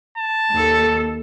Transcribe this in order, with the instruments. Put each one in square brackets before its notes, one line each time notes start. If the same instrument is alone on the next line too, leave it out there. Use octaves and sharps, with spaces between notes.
[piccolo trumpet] A5
[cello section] D#2 A4